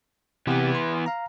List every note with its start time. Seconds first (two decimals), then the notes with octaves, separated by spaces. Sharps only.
0.47 C3 E3 B3 G4
0.75 C6
1.06 F5 A#5